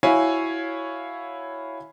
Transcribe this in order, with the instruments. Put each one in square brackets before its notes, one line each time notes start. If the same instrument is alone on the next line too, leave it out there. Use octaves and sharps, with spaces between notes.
[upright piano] E4 F#4 C#5 F5 G#5 B5